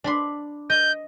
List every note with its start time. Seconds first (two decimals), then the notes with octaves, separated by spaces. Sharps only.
0.04 D4 B5 C6
0.70 D#5 G6